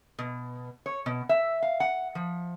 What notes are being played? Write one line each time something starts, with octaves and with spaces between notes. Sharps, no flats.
B2
C#5
B2
E5
F5
F#5
F3